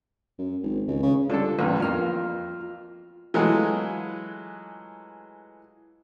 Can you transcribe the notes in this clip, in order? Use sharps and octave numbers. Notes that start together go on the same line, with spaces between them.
F#2
G#1
C#2
C#3
D3 G3 D4 F4 A4
A1 E2 G2 B4
F2 A#3 F4 F6
E3 F#3 G#3 A3 F4 G#4